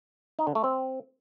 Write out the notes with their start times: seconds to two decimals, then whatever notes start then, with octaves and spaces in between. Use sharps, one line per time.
0.39 D#4
0.47 D3
0.55 A3
0.64 C4